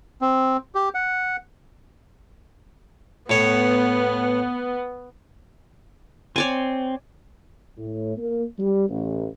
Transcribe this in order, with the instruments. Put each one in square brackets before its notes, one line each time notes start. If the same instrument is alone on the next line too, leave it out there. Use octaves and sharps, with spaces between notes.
[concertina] C4
G4
F#5
[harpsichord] A2 C#5 [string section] B3
[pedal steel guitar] C4 [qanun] C#5 D5 G#5
[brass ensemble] A2
A#3
G3
A1